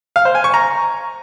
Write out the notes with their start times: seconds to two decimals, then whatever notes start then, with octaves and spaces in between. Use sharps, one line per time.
0.16 F5
0.25 C5
0.35 G#5
0.44 C#6
0.54 A#5